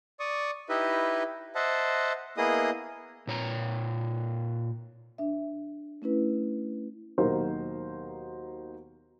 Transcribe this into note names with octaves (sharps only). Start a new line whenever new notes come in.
D5 C#6 D#6
D#4 E4 G4 B4 D#5 E5
C5 D#5 E5 F#5 A5
A#3 B3 E4 G#4 D#5 D#6
A#2 C#5 A#5
D4 E5
A3 C#4 E4 B4
D#2 B2 F#3 D#4 A#4 C5